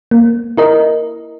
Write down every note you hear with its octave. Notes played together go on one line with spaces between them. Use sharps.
A#3
E4 A#4 D#5